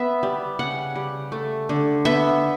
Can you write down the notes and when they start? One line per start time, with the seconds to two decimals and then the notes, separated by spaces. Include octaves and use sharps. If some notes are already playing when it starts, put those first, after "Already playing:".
Already playing: B3 E5
0.23 G3
0.59 C#3 F#5
0.96 G3
1.32 A3
1.69 D3
2.05 B3 E5